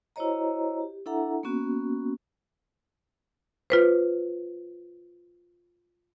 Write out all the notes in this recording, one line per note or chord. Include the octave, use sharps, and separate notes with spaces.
E4 F#4 C5 C#5 D#5 A#5
G4
D4 E4 A4 E5 F#5 A#5
A#3 B3 C#4 F#4
F4 B4 C5